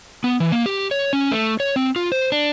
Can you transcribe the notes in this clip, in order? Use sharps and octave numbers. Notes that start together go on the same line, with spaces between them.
B3
E3
A#3
G4
C#5
C#4
A3
C#5
C4
F4
C5
D4